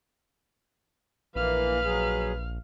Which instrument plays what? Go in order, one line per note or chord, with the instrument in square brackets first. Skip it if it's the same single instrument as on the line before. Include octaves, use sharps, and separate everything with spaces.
[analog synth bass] A#1 [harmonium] E3 A#3 [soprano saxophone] B4 [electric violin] F5 F6
[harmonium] F#3 G#4